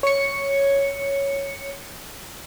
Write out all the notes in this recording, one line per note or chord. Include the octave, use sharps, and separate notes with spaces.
C#5 C#7